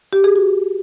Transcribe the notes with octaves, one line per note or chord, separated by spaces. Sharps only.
G4
G#4
F#4